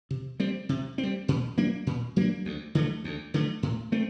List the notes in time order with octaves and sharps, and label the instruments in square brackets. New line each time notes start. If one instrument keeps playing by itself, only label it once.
[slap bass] C3
G3 C4
C3
C4
G3
A#2
F#3 A#3 D4
A#2
F#3 A#3 D4
D2
D3 F#3 A3
D2
D3 F#3 A3
A2
A3 C4